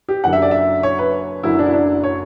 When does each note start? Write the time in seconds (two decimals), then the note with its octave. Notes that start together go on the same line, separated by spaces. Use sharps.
0.08 G4
0.24 F#1 F#2 D3 F#3 F#5
0.33 E5
0.42 D5
0.51 E5
0.83 C#5
0.98 B4
1.43 F#1 F#2 D3 F#3 E4
1.59 D4
1.66 E4
1.73 D4
2.04 C#5